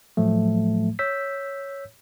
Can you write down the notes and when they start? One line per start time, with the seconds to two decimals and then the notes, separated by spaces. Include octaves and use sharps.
0.17 A2 F3 F#3 A3
0.99 C#5 E6 G6 B6